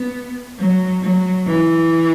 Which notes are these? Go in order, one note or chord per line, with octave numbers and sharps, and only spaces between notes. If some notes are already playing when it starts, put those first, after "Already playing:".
Already playing: B3
F#3
F#3
E3